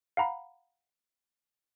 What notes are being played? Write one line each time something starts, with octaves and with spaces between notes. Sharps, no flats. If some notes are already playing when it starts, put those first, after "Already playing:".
F5 F#5 A#5 B5